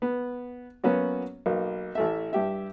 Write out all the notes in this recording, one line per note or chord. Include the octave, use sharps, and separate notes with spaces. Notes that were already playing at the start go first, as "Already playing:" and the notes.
B3
F#3 A#3 B3 C#4 F#4
B1 A#3
A1 A3 E5
G2 G4 E5